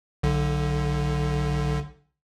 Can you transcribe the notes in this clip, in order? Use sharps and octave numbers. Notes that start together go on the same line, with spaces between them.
B1 D3